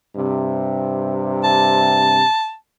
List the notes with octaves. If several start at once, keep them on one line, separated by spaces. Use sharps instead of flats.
G2 C3
A5